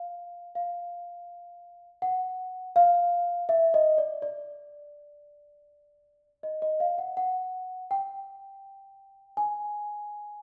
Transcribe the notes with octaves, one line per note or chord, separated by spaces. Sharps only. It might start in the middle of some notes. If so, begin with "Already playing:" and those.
Already playing: F5
F5
F#5
F5
E5
D#5
D5
D5
D#5
D#5
F5
F#5
F#5
G5
G#5